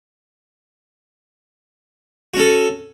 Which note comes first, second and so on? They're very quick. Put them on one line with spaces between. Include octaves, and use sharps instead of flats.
F#4 C#4 A4